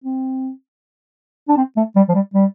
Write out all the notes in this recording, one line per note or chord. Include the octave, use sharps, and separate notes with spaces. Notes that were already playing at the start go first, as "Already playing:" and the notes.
C4
D4
C4
A3
G3
F3
G3
G3